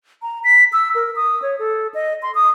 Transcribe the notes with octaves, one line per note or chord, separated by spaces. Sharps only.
A#5
B6
E6
A#4
D#6
C#5
A4
D#5
C6
D#6